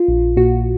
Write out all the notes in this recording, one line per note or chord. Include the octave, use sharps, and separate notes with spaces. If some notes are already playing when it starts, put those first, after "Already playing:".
Already playing: F4
A#1
A#2 F#4